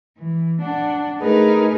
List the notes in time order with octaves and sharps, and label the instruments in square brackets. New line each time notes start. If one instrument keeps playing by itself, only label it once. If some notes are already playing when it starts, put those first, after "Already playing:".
[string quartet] E3
D4 F#5
A3 D#4 G#4 A#4 B4